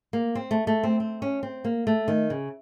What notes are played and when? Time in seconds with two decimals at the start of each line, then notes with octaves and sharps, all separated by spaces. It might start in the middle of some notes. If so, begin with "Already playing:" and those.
0.13 A#3
0.35 C4
0.51 A3
0.67 A3
0.84 C4
1.00 C4
1.22 C#4
1.43 C4
1.64 A#3
1.87 A3
2.08 D#3
2.30 C#3